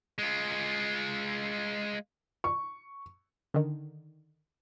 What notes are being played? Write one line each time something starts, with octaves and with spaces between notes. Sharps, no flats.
G#3 F4
C#6
D3 D#3